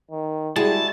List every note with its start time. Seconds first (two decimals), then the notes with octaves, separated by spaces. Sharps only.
0.11 D#3
0.56 G3 G#3 E4 F#4 G#4 A5